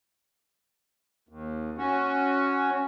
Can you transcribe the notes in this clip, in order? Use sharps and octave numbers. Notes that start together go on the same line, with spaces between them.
D#2
C#4 F#4